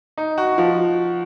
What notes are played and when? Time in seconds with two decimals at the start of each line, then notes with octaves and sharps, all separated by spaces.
0.17 D#4
0.38 F#4
0.58 F3